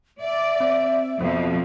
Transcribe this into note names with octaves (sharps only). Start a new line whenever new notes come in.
D5 E5
C4
F2 B2 C4